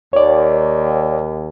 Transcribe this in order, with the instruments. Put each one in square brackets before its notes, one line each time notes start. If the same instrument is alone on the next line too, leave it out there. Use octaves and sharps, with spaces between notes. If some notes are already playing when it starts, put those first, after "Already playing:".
[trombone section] D#2 [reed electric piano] C#5 D5